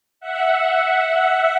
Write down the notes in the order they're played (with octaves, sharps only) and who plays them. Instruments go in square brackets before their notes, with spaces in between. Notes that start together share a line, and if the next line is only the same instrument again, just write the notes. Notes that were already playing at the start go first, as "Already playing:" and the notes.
[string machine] E5 F#5